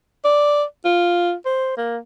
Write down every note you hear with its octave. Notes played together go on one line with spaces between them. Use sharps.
D5
F4
C5
A#3